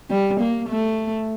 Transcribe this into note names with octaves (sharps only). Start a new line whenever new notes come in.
G3
A#3
A3